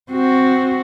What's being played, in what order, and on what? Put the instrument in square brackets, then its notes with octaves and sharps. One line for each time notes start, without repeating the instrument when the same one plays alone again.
[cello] C4 F#4